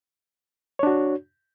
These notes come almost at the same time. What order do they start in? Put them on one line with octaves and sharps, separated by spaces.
C#5 D4 F#4